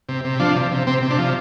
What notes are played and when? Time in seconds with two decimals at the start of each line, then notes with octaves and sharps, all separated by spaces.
0.09 C3
0.25 C3
0.40 F3 D4
0.56 C3
0.71 C3
0.87 C3 C4
1.03 C3
1.10 D4
1.18 F3